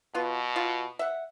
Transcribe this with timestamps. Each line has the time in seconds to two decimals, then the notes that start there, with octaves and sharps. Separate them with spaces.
0.15 B2 B3 F4
0.56 F4
0.99 E5 F#5